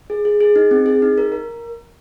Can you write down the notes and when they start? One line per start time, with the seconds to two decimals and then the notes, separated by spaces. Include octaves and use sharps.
0.10 G#4
0.25 G#4
0.41 G#4
0.56 D#4
0.71 C4
0.86 G#4
1.02 D#4
1.18 A#4
1.32 A#4